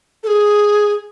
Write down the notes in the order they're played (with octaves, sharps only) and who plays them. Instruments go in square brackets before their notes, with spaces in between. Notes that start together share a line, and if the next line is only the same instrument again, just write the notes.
[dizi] A4
G#4